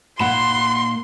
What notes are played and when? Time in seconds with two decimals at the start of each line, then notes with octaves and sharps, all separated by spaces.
0.19 A#2 A#3 D#4 F#5 B5 C6 E7